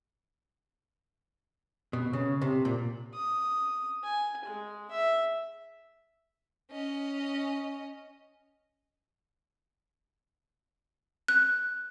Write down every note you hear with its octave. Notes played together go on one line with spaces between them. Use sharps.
B2
C#3
C3
A#2
D#6
G#5
G#3
E5
C#4 D#5
F#6